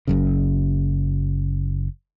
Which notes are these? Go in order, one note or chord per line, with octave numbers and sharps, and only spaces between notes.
F#1 F#2 C#3